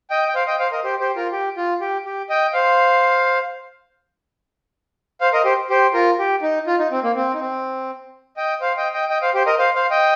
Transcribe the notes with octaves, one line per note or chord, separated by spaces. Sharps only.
D#5 G5
G5
C5 F5
D#5 G5
C5 F5
A#4 D#5
G4 C5
G4 C5
F4 A#4
G4
F4
G4
G4
D#5 G5
C5 F5
C5 F5
A#4 D#5
G4 C5
G4 C5
F4 A#4
G4
D#4
F4
D#4
C4
A#3
C4
D#4
C4
D#5 G5
C5 F5
D#5 G5
D#5 G5
D#5 G5
C5 F5
G4 C5
A#4 D#5
C5 F5
C5 F5
D#5 G5